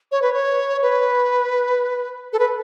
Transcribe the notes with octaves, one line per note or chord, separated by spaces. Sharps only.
C#5
B4
C#5
B4
A4
B4